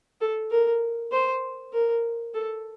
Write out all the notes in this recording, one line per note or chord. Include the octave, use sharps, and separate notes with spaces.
A4
A#4
C5
A#4
A4